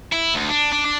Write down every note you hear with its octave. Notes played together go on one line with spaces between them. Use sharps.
E4
D2
D4
D4
D4